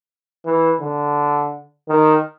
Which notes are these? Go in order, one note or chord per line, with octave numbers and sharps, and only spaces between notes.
E3
D3
D#3